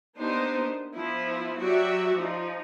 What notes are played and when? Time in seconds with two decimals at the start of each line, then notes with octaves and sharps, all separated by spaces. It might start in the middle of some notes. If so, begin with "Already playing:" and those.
0.18 A#3 B3 D4 D#4 G4 C5
0.94 F3 B3 E4
1.58 F#3 F#4 G4 D5 E5
2.14 F3 D#4